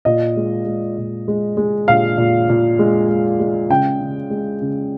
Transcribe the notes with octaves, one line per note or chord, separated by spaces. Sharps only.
A#2 D#5
G#3
G#3
A#2
G#3
G#3
A#2 F5
A#2
A#2
G#3
G#3
G#3
C#3 G5
C#3
G#3
C#3